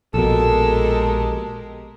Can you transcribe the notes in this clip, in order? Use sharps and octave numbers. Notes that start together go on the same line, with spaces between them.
A#1 B2 G#3 G4 A4 A#4